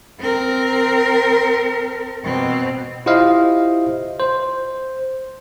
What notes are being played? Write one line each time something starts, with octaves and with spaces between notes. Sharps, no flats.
C4 A#4
B2 C4
E4 F4 G4 C5 D#5 F5
C5